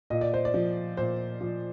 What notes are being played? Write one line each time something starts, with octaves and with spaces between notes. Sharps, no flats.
A#2 D#5
D5
C5
D5
F3
A#2 C5
F3